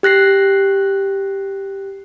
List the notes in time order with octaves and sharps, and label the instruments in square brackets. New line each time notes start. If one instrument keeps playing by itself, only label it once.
[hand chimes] G4 F#6 A#6 C7